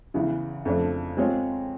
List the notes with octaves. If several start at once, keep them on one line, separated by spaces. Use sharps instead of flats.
E2 C#3 E3
F2 C#3 F3 A3 D4
G#3 C4 F4 G#4 C#5